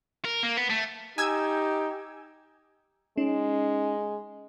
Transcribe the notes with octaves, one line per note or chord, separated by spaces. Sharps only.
A#4
A#3
B3
A3
D#4 G4 G#5 E6 G#6
G#3 C#4 D#4